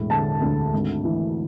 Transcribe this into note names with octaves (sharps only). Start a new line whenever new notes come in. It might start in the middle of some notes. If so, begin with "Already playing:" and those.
Already playing: E1 A2
D3 A5
D2
G#1
E3